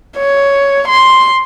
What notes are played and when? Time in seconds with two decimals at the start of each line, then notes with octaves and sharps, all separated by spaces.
0.19 C#5
0.88 C6